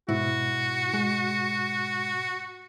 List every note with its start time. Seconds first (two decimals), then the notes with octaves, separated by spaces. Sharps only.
0.09 G#2 B2 E4 F#4
0.94 G#3